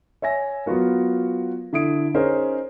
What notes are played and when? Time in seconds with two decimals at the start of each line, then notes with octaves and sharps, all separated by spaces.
0.22 C#5 E5 G#5 A#6
0.66 F#3 B3 F4 F#4 A#4
1.73 D3 E4 D#6 D7
2.14 C#4 D#4 G#4 A#4 C5 C#5